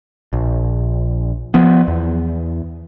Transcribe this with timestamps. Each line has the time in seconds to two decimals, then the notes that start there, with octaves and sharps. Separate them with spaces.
0.33 A#1
1.54 F3 B3
1.88 E2